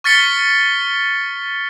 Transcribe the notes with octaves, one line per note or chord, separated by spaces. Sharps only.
C#6 F6 A6 B6 C#7 G7